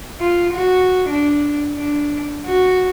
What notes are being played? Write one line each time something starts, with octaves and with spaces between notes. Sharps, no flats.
F4
F#4
D4
D4
F#4